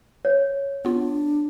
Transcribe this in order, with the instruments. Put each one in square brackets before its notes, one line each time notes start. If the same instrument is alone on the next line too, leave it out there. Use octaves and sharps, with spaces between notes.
[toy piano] C#5
[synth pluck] B3 F4 [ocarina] D4